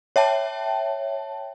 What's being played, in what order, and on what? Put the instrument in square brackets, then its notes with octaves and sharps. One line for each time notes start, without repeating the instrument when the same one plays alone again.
[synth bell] C#5 E5 G5 A5